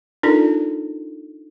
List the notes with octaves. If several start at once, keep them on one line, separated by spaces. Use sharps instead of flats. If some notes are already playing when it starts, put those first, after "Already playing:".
D4 D#4 F4 A4 A#4 D5